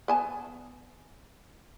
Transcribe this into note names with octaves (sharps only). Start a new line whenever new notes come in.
B3 G#5 A5